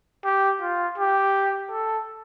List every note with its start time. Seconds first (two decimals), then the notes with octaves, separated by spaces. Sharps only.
0.25 G4
0.62 F4
0.98 G4
1.71 A4